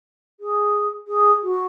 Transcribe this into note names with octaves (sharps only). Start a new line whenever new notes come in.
G#4
G#4
F#4